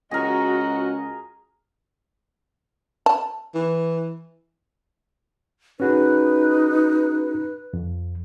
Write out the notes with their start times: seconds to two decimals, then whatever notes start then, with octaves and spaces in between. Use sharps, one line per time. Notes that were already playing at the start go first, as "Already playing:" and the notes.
0.11 C#2 F#4 G#4 A#4 D#5
3.06 A5
3.55 E3
5.80 C#4 D#4 F#4 G#4 B4
7.73 F2